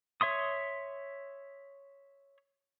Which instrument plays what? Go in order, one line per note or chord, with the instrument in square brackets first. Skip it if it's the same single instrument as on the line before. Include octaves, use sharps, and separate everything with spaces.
[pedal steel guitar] C#5 E5 C6 D#6